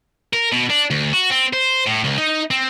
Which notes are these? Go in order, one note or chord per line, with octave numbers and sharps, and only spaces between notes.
A#4
B2
D4
D2
F#4
C4
C5
A2
C#2
D#4
C4